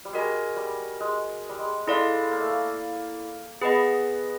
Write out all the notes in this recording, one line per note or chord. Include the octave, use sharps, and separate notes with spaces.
G3
G#3 F#4 A#4 D#5 G#5
G3
G#3
G3
G#3
G#3 E4 A4 D5 F5
A#3
A3
A#3
B3 G#4 B4 D#5